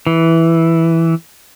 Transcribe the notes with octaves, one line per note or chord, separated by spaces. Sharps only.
E3